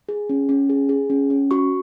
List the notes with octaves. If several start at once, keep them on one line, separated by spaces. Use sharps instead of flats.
G#4
C#4
C#4
G#4
G#4
C#4
C#4
F#4 C#6